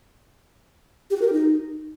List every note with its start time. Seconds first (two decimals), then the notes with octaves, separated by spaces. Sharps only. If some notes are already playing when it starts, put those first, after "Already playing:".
1.10 G4
1.16 F#4
1.21 A#4
1.27 G4
1.33 D#4